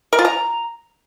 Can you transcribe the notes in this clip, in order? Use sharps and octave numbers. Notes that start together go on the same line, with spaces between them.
A#4
F4
A#5